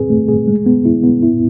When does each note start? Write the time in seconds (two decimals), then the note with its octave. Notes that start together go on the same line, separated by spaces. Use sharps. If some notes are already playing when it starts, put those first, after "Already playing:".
Already playing: C4 G#4 B4
0.10 A3
0.29 G#4
0.48 G#3
0.66 B3
0.85 E4
1.04 B3
1.23 E4